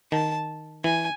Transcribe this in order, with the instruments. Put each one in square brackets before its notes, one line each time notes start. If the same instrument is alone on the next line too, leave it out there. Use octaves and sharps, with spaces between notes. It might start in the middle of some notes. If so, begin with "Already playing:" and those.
[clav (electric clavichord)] D#3 [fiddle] A5
[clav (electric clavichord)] E3 [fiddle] G#5